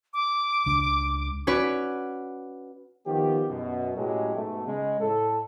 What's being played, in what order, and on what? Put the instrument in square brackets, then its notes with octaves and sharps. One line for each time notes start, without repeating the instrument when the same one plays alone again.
[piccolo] D6
[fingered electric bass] C#2 D4
[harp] C#4 F#4 B4 D5
[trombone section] D#3 F3 B3 G4
F#2 B2
A2 F#3 G#3 C#4 G4
G#2 B2 A3
C#3 G#3
A2 A4